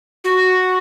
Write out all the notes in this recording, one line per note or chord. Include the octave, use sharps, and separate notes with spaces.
F#4